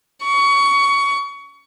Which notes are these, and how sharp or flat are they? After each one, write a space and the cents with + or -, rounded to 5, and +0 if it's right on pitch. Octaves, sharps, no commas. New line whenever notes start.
C#6 +20